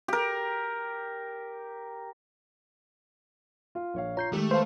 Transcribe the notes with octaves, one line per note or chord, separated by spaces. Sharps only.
G4 A#4
F4 F5
A#1 C#5 F5
F4 C#5 A#5 G6 C7
D#3 G#3 A3 G4
B4 C5 F5 A5